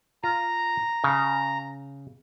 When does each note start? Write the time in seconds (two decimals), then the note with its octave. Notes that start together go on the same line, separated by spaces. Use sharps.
0.24 F4 A#5
1.04 C#3